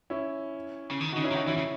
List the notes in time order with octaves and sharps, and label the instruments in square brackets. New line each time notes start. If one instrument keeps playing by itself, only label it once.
[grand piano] C#4 E4
[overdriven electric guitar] C#3
D#3
[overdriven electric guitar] C#3 [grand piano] D#4 F#4
[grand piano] C#4 E4
[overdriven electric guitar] D#3 [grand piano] D#4 F#4
[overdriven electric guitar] E3 [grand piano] C#4 E4
[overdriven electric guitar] C#3